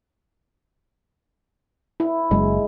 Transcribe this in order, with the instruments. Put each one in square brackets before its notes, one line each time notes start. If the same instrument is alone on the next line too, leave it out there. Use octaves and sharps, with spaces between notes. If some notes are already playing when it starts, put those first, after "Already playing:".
[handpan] E4
[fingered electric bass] F#1 [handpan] G#3